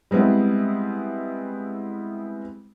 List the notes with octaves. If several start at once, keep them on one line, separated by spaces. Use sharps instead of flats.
G3 G#3 B3 C4 E4